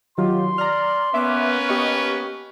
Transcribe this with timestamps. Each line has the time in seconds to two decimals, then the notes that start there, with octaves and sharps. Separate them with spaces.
0.18 D#3 F#3 F4 G4 C6
0.58 D5 A#5 F6
1.14 A#3 B3 C#4 B4 E5 D6
1.69 B3 G4 D#5 C#6